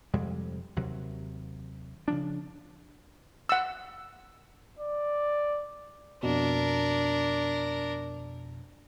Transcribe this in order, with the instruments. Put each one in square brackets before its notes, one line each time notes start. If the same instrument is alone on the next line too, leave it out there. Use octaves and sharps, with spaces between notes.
[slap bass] F2 C3 G3 G#3
D#2 C3 F#3
C#3 F3 D4
[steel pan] F#5 E6
[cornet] D5
[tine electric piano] F2 B2 [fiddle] D4 A#4